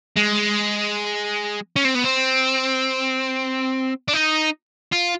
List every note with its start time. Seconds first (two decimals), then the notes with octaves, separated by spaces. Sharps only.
0.17 G#3
1.76 C#4
1.85 C4
1.95 B3
2.04 C4
4.08 D4
4.13 D#4
4.92 F4